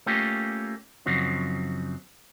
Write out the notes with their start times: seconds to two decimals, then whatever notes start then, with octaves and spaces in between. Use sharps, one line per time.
0.06 A3 A#3 C#4 F4 G4
1.06 F#2 C#3 F3 F#3 C4 D#4